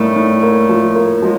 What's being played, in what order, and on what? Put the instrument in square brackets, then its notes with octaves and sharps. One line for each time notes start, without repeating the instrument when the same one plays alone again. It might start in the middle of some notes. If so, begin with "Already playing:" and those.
Already playing: [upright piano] A2 A#3 [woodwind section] G3 A3
[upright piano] A2
A#3
F3
A#3
[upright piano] F3 [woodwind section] F#3 G#3